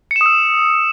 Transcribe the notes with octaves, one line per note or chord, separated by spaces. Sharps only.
D#6 E6 C#7 E7